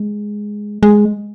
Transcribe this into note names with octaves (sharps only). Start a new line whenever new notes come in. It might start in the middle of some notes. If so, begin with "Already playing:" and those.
Already playing: G#3
G#3